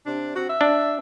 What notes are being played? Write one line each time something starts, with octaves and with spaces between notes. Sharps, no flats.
C3 D4
C4 F#4
E5
D4